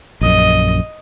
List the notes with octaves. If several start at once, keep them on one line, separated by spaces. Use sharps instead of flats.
A#1 F#2 D#5